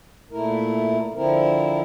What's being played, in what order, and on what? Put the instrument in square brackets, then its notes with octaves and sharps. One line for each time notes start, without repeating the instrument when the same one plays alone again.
[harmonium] A#2 A3 E4 A#4
D3 F3 C4 E4 A#4